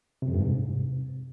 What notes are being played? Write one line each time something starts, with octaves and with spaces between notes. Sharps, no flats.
C3
F2
G2
G#2
C3